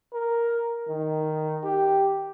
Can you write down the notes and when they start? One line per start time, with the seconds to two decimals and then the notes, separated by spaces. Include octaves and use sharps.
0.13 A#4
0.88 D#3
1.64 G4